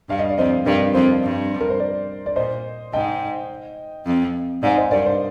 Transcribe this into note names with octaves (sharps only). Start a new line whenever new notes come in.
G2 F5
D#5
D5
F2 C5 D#5
G2 A#4 D5
F2 C5
G2
A#4
C5
A#4 D5
D5
A#2 C5 D#5
G#2 D#5 G5
F2
G#2 D5 F5
C5 D#5
G2 A#4 D5
C5